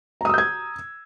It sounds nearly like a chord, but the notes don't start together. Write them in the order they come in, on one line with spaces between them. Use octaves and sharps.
A#5 D#6 E6 G6 G#6